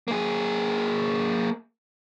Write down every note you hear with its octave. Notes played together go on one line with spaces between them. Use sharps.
A#3 G#4